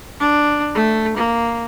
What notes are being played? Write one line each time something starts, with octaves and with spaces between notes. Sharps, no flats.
D4
A3
A#3